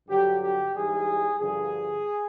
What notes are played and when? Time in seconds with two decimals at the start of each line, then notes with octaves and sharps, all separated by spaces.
0.08 G2 D3 F#3 G4
0.41 G4
0.74 G#2 E3 G3 G#4
1.40 G2 D3 F3 G#4